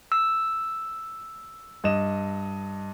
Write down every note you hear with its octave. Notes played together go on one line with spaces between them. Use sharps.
E6
G2 D#5 E7